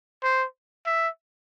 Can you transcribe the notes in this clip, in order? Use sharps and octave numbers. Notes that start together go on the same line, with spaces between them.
C5
E5